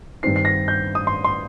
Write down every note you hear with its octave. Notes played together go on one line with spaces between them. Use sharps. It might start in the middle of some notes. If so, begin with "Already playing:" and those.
G2 D#3 C4 D#4 C7
C7
A#6
G6
D#6
C6
C6